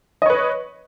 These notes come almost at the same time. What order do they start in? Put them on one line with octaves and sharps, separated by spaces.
D#5 C#5 B4